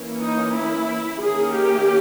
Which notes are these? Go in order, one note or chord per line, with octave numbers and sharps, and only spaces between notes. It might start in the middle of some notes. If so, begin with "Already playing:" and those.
Already playing: E3 A#3 C#4
D#4
E4
D#3 A#3 C#4 G#4
G4